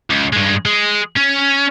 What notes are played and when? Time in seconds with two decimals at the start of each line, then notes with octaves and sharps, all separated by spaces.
0.10 C#2
0.33 G2 G#3
0.65 G#3
1.16 C#4